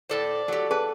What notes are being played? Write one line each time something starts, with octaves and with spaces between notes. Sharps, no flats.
A2 A4 C5 D5
F#3 G4 A4
G#4 B4 A5